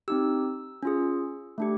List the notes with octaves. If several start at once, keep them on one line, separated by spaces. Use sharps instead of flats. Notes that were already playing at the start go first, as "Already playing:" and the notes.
C4 D#4 G4 E6
C#4 F4 G#4
A3 D4 G4